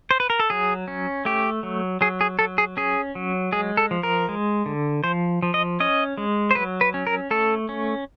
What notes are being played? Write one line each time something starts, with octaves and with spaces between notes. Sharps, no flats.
C5
B4
A#4
A4
F#3 G#4
C#4
A3 G4
F#3
F#3 G#4
G#4
F#3 A4
G#4
C#4 G#4
F#3
G#3 G#4
A4
F3
A#4
G#3
D3
F3 C5
F3
D#5
C#4 D#5
G#3
C5
F#3 B4
B4
C#4
A#4
A3 A4
C#4